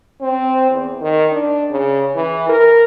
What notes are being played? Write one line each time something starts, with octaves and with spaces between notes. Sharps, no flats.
C4
E2
D#3
D4
C#3
E3
A#4